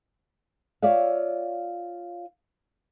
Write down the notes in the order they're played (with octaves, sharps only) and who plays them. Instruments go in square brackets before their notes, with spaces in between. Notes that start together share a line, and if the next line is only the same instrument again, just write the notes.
[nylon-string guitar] F4 C#5 D5 E5 F5